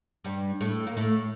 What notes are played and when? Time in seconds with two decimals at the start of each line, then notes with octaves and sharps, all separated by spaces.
0.24 G2 G3
0.61 A2 A3
0.87 A#3
0.97 A2 A3